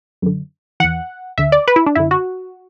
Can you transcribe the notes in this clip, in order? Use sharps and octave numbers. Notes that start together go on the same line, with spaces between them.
F#2 D3
E2 E3 F#5
D2 D3 E5
D5
B4
E4
D4
F#2 D3 E4
F#4